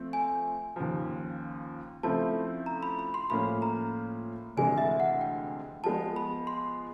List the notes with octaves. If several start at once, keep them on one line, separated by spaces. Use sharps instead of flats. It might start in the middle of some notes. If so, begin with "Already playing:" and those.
Already playing: F3 A3 C4
G#5
D#2 C#3 F3
C#3 F3 A3 C4 E4 A5
A#5
B5
B5
C6
A2 F3 A#3 C#4 F4 B5
A#5
D2 C3 E3 G#3 G#5
E5
F#5
G5
F3 G#3 B3 A5
B5
C6